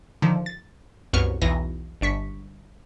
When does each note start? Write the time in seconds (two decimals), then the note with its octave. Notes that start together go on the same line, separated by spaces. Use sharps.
0.22 D3 D#3 F3
0.46 A6
1.13 C2 F#2 B3 C#6 F6
1.42 B1 E2 E3 A#6
2.01 G1 D4 C#6 B6